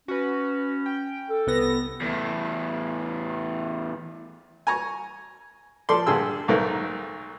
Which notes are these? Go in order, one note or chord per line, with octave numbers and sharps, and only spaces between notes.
C#4 F#4 B4
G5
A4
C2 B3 A#6
E2 A2
G#5 A#5 C#6
F3 A4 D5 C6
G2 D3 G#4 C6 E6
B1 G#2 A3 A#4